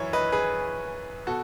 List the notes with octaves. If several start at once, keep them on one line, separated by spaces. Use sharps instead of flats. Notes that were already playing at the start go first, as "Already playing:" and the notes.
Already playing: F#2 E3 C#5 E5
B4 D#5
G#4 B4
B2 F#4 A4